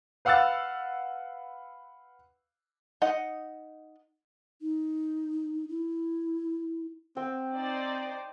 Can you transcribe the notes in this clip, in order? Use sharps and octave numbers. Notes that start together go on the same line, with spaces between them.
B4 F5 F#5 E6 F#6 A6
D#4 D#5 F#5
D#4
E4
C4 G5
D#4 C5 D5